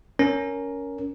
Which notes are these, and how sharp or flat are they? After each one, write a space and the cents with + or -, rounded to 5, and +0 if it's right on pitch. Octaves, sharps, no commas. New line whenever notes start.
C#4 +15 A#4 +0